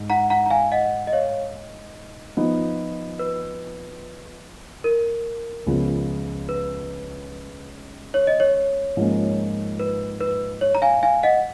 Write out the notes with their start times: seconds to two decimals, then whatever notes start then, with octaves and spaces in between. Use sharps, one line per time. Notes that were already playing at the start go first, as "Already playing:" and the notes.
Already playing: G#2
0.10 F#5 A#5
0.30 F#5 A#5
0.46 A#5
0.50 F5 G#5
0.72 D#5 F#5
1.07 D#5
1.13 C#5 F5
2.37 F3 B3 D#4
3.19 B4
4.84 A#4
5.66 C#2 C#3 F3 B3
6.49 B4
8.14 C#5
8.27 D#5
8.40 C#5
8.97 G#2 F3 A#3 C#4
9.79 B4
10.21 B4
10.61 C#5
10.75 A#5
10.82 F5 G#5
11.03 F5 G#5
11.23 D#5 F#5